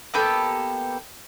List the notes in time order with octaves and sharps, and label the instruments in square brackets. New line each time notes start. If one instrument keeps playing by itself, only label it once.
[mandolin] A#3 B3 G4 A4